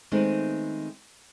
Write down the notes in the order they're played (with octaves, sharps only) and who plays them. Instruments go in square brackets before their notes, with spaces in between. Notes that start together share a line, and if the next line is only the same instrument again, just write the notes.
[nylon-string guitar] D#3 G#3 A3 B3 C4 D#4